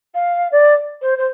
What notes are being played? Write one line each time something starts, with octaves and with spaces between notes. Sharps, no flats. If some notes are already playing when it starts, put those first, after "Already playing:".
F5
D5
C5
C5